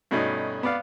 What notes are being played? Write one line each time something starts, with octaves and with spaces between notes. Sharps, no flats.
G2 B2 A3 C#4 D#4
B3 D5 F5